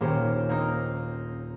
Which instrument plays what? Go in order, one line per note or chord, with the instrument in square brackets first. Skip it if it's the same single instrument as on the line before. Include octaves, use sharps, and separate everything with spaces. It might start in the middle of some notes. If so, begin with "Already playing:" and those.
[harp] D#1 C#4 [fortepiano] A#3 G4 C5
[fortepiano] A#3 C4 D#4